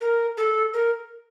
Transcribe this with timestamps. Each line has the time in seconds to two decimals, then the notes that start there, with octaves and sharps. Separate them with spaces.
0.01 A#4
0.37 A4
0.74 A#4